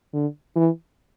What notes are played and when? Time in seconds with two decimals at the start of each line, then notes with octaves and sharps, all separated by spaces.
0.13 D3
0.56 E3